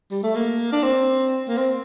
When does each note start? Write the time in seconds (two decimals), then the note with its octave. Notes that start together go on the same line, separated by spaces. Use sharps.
0.11 G3
0.23 A3
0.35 A#3
0.72 D4
0.83 C4
1.48 A#3
1.57 C4